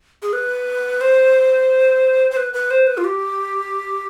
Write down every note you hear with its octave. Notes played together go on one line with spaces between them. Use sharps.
G#4
B4
C5
C5
B4
B4
C5
B4
F4
G4